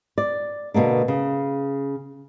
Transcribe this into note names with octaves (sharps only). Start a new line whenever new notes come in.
D5
B2 D3 A#3 D4
C#3